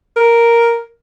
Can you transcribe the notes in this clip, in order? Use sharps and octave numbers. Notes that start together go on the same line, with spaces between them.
A#4